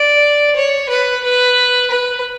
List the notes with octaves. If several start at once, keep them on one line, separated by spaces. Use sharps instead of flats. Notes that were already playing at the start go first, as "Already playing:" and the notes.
Already playing: D5
C#5
B4
B4
B4